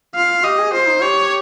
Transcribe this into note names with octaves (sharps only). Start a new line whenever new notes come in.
F4 F5
G4 D#5
G#4
F4 C5
D#4
G4 C#5